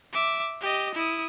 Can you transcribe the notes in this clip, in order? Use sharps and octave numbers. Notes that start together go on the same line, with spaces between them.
E5 D6
G4 D#5
E4 D#6